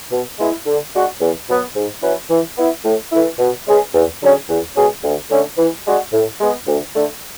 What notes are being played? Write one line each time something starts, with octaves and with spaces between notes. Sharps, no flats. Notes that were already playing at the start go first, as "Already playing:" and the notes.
B2
G#3 B3 E4
D3
G#3 D4 F#4
E2
B2 F#3 B3
G#2
F#3 C#4 E4 B4
E3
B3 E4
A2
E3 A3 E4
B2
G#3 C#4 G#4 B4
E2
D3 F#3 C#4 G#4
E2
B2 G#3 C#4 G#4
D2
D3 A3 C#4
E3
G#3 D4 F#4
A2
G#3 B3
D2
D3 A3